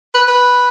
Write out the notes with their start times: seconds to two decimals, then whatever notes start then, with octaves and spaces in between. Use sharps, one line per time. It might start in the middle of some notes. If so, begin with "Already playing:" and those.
0.15 B4
0.28 B4